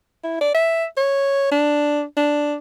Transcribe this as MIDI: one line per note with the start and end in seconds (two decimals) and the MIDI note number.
0.24 0.39 64
0.41 0.55 74
0.55 0.85 76
0.97 1.49 73
1.52 2.03 62
2.17 2.56 62